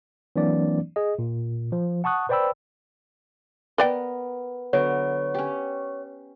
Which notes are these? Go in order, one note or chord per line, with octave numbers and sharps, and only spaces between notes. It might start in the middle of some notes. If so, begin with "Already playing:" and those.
E3 F#3 A#3 C4 D4 D5
G#4 D#5
A#2
F3
F#5 A5 C#6 D#6 F#6
B4 C5 D5 G5 B5 E6
B3 A#4 B4 D5 G5
D3 F#3 B3 C#5
C#4 G4